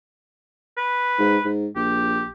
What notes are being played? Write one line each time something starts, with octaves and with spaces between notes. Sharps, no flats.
B4
G#2
G#2
A#1 G4